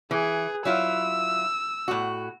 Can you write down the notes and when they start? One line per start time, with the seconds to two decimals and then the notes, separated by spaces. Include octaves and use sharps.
0.11 E3 G#4
0.65 F#3 E4 F4 E6
1.88 A2 F#4